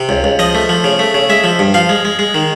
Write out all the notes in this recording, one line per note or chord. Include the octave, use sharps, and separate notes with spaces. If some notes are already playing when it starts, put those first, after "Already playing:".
Already playing: C3
C#2
C#2
F3 D#5
A3
F3
C#3
A3
C#3
G#3 E5
F3
G2
F3 F5
G#3
G#3
G#3
D#3